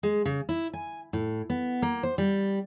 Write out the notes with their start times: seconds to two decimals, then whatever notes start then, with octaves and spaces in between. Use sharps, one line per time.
0.03 G#3
0.25 C#3
0.49 E4
0.73 G#5
1.13 A2
1.50 B3
1.82 A#3
2.03 C5
2.18 G3